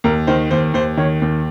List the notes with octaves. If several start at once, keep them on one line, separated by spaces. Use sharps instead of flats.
D#2 A#4
D#3 C5
D#2 C5
D#2 C5
D#3 C#5
D#2